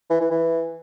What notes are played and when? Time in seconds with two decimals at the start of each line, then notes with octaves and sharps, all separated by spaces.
0.10 E3
0.21 E3
0.31 E3